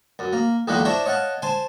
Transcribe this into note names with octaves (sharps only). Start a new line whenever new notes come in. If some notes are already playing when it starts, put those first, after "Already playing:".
F#2
A#3
B1 E2 D#3 G#3 A#3 F#5
D4 E4 C5 C#5 A#5
C#5 D#5 F5 F#5 A5
C5 G#5 A5 C6